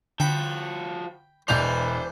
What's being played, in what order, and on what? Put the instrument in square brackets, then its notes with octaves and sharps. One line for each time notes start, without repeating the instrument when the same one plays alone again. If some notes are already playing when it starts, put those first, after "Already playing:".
[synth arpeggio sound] D3 [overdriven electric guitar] F3 F#4 [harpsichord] G5 B5
[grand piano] E1 G6 F7 [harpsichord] E3 D4 [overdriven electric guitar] C5 B5